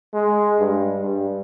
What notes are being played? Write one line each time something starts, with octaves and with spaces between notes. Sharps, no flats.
G#3
G2
G2